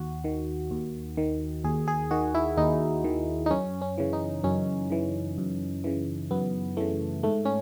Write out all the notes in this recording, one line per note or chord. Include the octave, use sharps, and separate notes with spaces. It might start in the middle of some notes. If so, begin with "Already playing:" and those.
Already playing: D#2 F#4
D#3
D#2
D#3
D#2 G#4
G#4
D#3 F#4
E4
D#2 D#4
D#3
D#4
F#2 C#4
C#4
C#3 E3
D#4
F#2 C#4
C#3 E3
F#2
C#3 E3
F#2 B3
C#3 E3 A3
G#2 A3
C#4